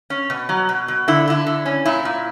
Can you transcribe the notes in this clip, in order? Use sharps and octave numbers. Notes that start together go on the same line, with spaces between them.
C#4
B2
F#3
B2
B2
D3 E4
D3 E4
D3
C#4
A#2 E4
A#2